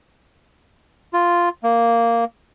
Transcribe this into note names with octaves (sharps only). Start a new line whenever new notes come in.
F4
A#3